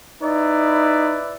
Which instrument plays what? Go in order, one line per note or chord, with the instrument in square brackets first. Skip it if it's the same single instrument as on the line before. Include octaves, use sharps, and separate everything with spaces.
[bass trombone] D#4 [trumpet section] E4 B4 D5